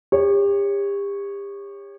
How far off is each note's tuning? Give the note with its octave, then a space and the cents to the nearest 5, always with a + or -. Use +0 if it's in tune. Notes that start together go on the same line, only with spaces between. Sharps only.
G4 +35 C#5 -5